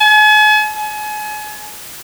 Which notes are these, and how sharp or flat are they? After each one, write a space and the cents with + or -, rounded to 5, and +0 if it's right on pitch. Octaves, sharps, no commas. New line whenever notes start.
G#5 +45
G#5 +35